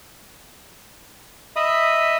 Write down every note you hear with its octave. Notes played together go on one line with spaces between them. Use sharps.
D#5 E5 B5 D#6